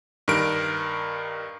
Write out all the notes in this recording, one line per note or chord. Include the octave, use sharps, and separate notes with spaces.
G2 D#3 A#4 D7